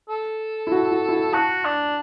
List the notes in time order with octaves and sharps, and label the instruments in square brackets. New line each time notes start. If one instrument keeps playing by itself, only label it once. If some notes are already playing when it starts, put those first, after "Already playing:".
[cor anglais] A4
[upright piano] E4
F#4
F#4
E4
F#4
[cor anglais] F#4 [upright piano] A5
[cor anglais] D4